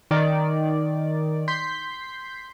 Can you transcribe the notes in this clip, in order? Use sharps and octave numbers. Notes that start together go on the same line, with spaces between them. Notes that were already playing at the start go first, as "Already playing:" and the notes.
D#3 D5
C6 G6 B6